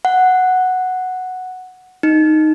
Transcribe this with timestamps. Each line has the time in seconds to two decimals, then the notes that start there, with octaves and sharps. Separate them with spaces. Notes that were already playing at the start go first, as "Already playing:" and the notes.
0.05 F#5
2.03 D#4